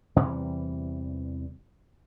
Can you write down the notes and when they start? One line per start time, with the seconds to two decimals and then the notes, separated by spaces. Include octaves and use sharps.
0.16 E2 C3 E3 G3